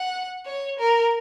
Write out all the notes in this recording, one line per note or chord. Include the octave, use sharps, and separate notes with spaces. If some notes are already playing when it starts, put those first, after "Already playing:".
Already playing: F#5
C#5
A#4